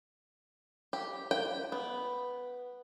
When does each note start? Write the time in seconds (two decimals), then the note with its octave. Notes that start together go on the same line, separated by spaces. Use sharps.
0.93 G4
1.31 G5
1.72 B3